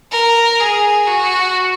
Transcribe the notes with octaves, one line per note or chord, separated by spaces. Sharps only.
A#4
G#4
F#4